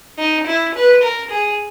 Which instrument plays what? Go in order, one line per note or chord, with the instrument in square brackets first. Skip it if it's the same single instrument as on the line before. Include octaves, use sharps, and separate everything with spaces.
[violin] D#4
E4
B4
A#4
G#4